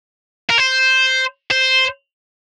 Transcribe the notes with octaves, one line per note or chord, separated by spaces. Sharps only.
A#4
C5
C5